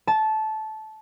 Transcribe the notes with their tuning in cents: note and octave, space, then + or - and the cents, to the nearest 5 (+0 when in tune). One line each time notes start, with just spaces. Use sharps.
A5 -15